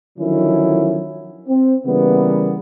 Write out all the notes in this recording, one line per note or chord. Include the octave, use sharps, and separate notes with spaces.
D3 D#3 F3 F#3 C#4 E4
C4
C#3 E3 G3 A#3 B3